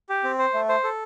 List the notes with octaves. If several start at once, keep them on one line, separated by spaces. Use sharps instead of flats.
G4
C4
C5
A3
C5
A4